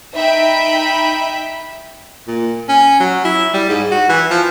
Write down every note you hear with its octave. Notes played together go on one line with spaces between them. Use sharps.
D#4 E5 G5 B5
A#2
C#4
F#3
E4
G3
G#2
F#4
E3
F3